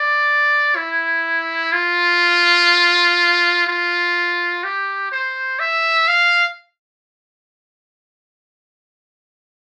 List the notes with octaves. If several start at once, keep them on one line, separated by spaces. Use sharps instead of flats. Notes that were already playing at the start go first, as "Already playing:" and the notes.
Already playing: D5
E4
F4
F4
G4
C5
E5
F5